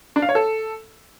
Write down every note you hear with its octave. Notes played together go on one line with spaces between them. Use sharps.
D4
F5
C#5
A4